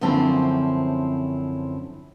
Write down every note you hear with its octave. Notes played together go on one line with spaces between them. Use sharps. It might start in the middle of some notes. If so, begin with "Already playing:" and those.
F#2 D3 F3 C4 C#4 E4